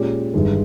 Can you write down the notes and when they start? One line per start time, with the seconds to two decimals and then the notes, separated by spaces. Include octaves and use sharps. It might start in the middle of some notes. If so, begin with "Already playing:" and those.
Already playing: A#2 G#3 C#4 G4
0.34 G1 G2 D#3 G#3